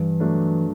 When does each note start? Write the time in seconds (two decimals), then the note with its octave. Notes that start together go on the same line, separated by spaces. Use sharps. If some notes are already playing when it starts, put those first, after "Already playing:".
Already playing: G2 E3
0.20 F#3 A3 D4